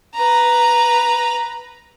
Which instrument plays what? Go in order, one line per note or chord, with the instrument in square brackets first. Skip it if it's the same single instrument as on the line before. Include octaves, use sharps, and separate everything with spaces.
[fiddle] B4 A#5